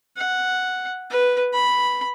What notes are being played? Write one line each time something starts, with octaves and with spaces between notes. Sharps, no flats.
F#5
B4
B5